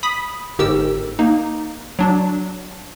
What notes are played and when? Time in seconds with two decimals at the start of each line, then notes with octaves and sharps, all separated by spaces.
0.03 B5 D#6 B6
0.59 G1 G#2 G4 A#4 E6
1.19 A#3 D#4
1.99 F#3 D4